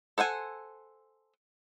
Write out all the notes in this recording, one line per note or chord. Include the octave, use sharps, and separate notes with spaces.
A4 C5 F#5 G#5